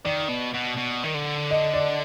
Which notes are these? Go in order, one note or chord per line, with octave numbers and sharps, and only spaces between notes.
D#3 D5
B2
B2
B2
D#3
D3
D#5
D5